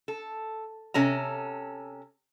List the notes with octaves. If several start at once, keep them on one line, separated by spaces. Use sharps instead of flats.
A4
C3 C#4 A4 A#5